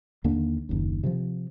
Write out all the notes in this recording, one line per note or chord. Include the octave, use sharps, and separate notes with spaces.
D#2 D3 A#3 D4
F#1 D#2
C3 E3 F3